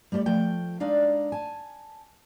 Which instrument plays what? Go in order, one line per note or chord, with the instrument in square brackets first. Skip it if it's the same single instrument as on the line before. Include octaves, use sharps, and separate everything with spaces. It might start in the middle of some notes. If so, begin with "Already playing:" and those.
[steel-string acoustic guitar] G3 A3 G4 C5 D5
F3 A3 G5
G#3 D4 D#4 D5 F5
G#5 A5